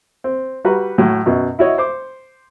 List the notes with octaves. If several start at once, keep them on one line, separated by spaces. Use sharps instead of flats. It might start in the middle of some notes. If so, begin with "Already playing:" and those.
C4
G3 F#4 B4 A#5
A2 F#3
F#2 B2
E4 F#4 C#5 D#5
C5 D6